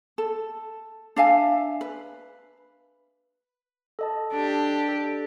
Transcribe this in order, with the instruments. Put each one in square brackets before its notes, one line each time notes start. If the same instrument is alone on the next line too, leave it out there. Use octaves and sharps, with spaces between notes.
[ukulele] A4
D4 E5 F5 G#5
B4
[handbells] A4 D#5 A5
[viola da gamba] D4 G4
[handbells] A4